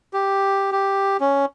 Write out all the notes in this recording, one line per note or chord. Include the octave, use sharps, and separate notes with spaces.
G4
G4
C#4